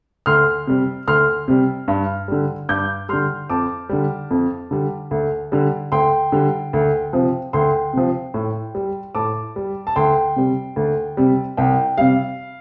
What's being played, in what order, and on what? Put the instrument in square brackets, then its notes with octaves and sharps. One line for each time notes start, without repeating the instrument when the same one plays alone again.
[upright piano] D2 C6 F6
C3 G3
D2 C6 F6
C3 G3
G2
D3 G3
G2 D6 G6
D3 G3 C6 F6
F2 A5 D6
D3 G3
F2
D3 G3
D2
D3 G3
D2 G5 C6
D3 G3
D2
C3 F3
D2 G5 C6
C3 F3
A2
G3
A2 A5 D6
G3
A5
D2 G5 C6
C3 G3
D2
C3 G3
C2 G5
C3 G3 F5